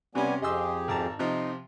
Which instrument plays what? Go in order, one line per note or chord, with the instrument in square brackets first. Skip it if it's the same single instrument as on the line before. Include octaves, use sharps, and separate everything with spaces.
[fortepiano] C3 C#4 [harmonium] G3 B3 G#5
[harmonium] F2 G4 G#4 [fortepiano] D#5 C6 E6
[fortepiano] G#1 A5 A#5
[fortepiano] C3 F3 F4 [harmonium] D#4